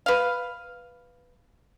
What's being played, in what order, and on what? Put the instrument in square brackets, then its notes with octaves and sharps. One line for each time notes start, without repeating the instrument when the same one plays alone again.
[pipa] B4 F5